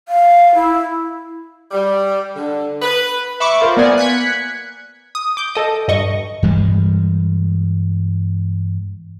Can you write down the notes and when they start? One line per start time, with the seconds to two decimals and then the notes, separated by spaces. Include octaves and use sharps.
0.08 F5
0.55 E4
1.71 G3
2.36 D3
2.82 B4
3.40 E5 B5 C#6 D6 C#7
3.61 F4 A#4 C5
3.76 A#3 B3 D5 F#5 G#5
3.98 F#6 G#6 B6 C#7
5.15 D#6
5.37 D6 G6
5.55 A4 D#5
5.88 G2 D#5 C#6
6.43 G2 E3 G3 G#3